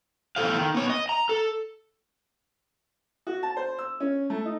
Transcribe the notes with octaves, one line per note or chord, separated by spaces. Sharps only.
E2 F3 A3 A4 C5 F5
D#3
B3 C#5
D#5
A#5
A4
F#4
A5
C5
E6
C#4
A3
D#4